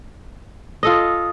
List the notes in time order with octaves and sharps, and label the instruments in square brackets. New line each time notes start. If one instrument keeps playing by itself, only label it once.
[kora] F4 A4 D#5 [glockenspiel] D#6